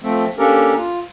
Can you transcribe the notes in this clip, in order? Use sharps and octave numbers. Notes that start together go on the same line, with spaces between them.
F3 A3 C4
A#3 C#4 D4 G4 A4 A#4
F4